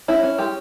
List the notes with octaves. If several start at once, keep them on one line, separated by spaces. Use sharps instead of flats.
C#4 E4
C#4
G#3 G4